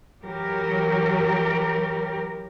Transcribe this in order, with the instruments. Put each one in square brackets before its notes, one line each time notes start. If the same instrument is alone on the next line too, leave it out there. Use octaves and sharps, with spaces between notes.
[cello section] E3 F#3 G4 A#4